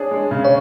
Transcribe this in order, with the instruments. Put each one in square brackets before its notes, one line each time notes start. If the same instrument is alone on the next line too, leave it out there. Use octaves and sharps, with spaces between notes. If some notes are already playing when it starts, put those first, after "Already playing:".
Already playing: [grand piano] D4 G#4 [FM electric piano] C#5
[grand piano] G#3
C#3
[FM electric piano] C#5